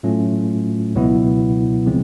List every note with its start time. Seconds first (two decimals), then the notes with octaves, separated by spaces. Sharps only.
0.03 A2 F#3 A3 C#4 F4
0.95 C#2 B2 F#3 B3 E4
1.86 C#3 F3 G#3 C4